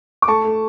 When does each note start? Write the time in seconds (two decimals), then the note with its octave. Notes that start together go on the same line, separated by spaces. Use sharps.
0.22 D6
0.28 A3 A5 C#6
0.44 A3